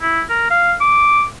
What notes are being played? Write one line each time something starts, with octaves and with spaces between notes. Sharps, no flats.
E4
A#4
F5
D6